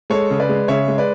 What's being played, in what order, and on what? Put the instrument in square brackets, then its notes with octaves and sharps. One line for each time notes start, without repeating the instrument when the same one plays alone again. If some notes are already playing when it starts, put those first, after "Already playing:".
[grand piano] G#3 A4 C#5
C#3
B4 D5
G#3
C#3 C#5 E5
G#3
B4 D5